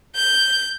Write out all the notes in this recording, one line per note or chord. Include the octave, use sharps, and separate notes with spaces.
G6